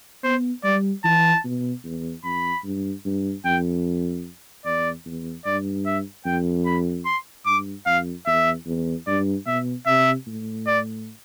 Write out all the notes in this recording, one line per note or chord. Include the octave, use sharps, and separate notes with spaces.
B3 C5
G3 D5
E3 A5
B2
E2
F2 B5
G2
G2
F2 G5
E2 D5
E2
G2 D5
E5
F2 G5
B5
C6
G2 D6
F2 F5
E2 E5
E2
G2 D5
B2 E5
C3 E5
A2
D5